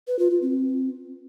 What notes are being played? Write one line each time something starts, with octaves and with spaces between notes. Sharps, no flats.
B4
F4
F4
C4